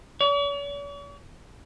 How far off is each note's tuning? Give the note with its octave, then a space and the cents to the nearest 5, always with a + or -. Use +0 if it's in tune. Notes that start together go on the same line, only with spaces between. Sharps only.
C#5 +45